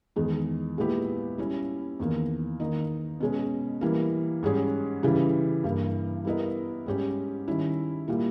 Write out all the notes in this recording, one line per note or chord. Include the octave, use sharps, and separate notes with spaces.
E2 D#3 G#3
A#2 G#3 B3 E4 G4
G3 C#4 E4
E2 D#3 A#3
D#3 A#3 D#4
B2 G#3 C#4
E3 G3 A#3
G#2 G3 C#4 G#4
C#3 E3 G3
G2 E3 A#3
G3 B3 E4 A#4 D#5
G#2 G3 C#4 G4
D#3 G3 C#4 E4
A#2 G3 A#3 E4